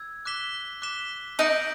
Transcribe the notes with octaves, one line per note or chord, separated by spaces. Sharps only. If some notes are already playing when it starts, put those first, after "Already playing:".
Already playing: E6 G#6
D6 F#6 B6 E7 G7
D6 F#6 B6 E7 G7
D#4 G6 A#6 D7 F#7